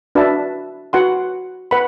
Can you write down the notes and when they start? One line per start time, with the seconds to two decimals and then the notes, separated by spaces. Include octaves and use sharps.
0.15 D4 F#4 B4 E5 A5
0.93 F#4 B4 F#5 C6
1.71 B4 F#5 B5